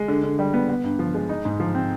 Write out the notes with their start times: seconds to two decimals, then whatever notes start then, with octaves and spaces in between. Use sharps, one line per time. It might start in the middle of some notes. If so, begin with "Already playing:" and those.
Already playing: G#3
0.08 D3
0.24 D3
0.39 G3
0.54 B3
0.69 B3
0.84 G2
0.99 F3
1.14 G#3
1.29 D#4
1.45 G#2
1.60 F3
1.75 C4